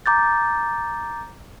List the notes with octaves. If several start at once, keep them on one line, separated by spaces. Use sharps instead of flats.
A#5 D6 G6 A6